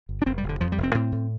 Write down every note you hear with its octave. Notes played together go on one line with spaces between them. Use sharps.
G1
D4
F1 C4
G3
F1
D3
F2 F3
G3
F1
C4
A2 C4
A2